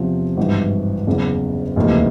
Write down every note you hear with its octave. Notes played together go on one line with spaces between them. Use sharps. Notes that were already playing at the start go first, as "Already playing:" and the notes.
Already playing: E2 C3 F3
G#1 G2 E3
F#1 E2 C#3
F1 D#2 C#3 E3